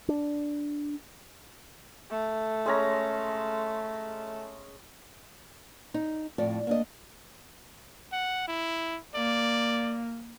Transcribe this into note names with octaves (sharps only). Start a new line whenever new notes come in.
D4
A3
G#3 C#4 A#5
D#4
F2 A2 D5
A#3 D4 D#5
F#5
E4
A#3 D5